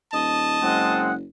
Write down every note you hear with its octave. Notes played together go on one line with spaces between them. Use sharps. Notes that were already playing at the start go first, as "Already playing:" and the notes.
D#1 D#5 A5
F#1 G#3 C4 F#5